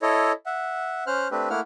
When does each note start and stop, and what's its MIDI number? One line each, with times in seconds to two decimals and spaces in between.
0.02 0.32 64
0.02 0.32 69
0.02 0.32 73
0.02 0.32 75
0.46 1.04 76
0.46 1.04 78
1.07 1.28 61
1.07 1.28 72
1.07 1.28 89
1.07 1.28 90
1.31 1.49 57
1.31 1.49 60
1.31 1.49 62
1.31 1.49 67
1.31 1.49 71
1.50 1.60 57
1.50 1.60 58
1.50 1.60 64
1.50 1.60 78
1.50 1.60 89